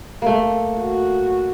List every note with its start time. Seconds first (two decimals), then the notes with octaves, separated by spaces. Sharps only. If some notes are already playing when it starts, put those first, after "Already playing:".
0.22 A3 A#3
0.77 F#4